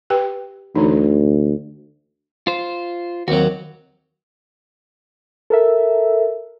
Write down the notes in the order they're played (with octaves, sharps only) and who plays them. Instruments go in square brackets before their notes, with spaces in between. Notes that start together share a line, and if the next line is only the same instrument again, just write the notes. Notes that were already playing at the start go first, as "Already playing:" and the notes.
[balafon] G4 B4 G5
[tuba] D2 [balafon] D3 E3 D#4
[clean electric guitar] F4 C5
[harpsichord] D#2 F#3 [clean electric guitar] C4 F#4
[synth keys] A4 A#4 E5